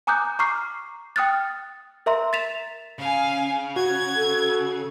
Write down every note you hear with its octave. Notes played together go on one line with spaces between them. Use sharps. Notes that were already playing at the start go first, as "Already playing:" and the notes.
G#5 A#5 D6 D#6 F#6 G6
A#5 C#6 D6 F6 C7
G5 D#6 F6 F#6 A6
A#4 E5 A#5 C6
A6 B6 E7 F7
C#3 F5 G#5
F#4 G#6
A4